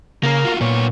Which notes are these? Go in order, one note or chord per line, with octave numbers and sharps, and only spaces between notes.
C#3 A#3 A#4
F4 F#4
A#2 B3 C#5